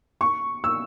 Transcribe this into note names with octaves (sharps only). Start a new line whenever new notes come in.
C#6
E6